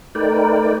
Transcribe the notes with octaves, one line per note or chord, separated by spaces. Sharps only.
A3 D#4 A#4 B4 D5 G5